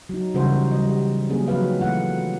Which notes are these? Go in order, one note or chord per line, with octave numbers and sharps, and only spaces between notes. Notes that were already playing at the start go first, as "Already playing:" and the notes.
F#3 D#4
C#3 E3 G3 D#4 F#4 C5
G3 D#5
F#3 A#3 C4 C#4 G#4
F3 F#3 C4 D#4 B4 F5
E3 A3 F4 F#5